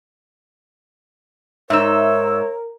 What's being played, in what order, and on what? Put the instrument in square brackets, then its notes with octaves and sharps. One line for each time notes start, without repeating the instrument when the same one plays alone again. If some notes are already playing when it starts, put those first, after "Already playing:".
[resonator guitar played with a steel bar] G#2 D#4 [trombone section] A#4 [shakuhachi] C#5 [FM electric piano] E5 E6